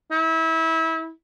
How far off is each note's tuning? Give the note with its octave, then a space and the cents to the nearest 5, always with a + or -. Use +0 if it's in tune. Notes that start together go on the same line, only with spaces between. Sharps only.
E4 -25